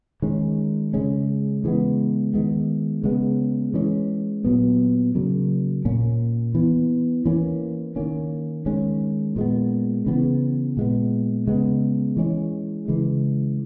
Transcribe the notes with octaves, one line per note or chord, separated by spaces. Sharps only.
D#3 G#3 C#4
C#3 G#3 C#4
C#3 E3 G#3 B3
D#3 G#3 B3
C#3 G#3 B3
E3 G#3 C#4
A#2 F#3 B3
C#3 F#3 A#3
A#2 A#3 C#4
E3 B3
E3 A#3 C#4
D#3 A#3 C#4
D#3 G#3 C#4
A#2 G#3 B3
C#3 E3 B3
A#2 G#3 B3
C#3 G#3 B3
E3 G#3 C#4
C#3 E3 G#3